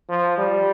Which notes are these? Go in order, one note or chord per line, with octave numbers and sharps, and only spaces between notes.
F3
G3